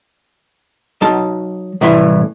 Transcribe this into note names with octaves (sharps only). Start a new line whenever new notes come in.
F#3 D#4 A5
C2 A2 E3 E5 B5 C6